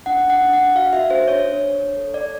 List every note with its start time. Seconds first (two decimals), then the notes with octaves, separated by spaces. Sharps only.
0.06 D4 F#5
0.24 D4
0.30 F#5
0.41 D4
0.53 F#5
0.59 D4
0.75 F#4 F5
0.93 F#4 E5
1.10 D4 C5
1.27 D4 C#5
1.45 D4
1.62 D4
1.80 D4
1.97 A4
2.14 A4 D5